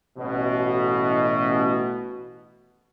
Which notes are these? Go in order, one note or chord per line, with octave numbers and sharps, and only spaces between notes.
A1 B2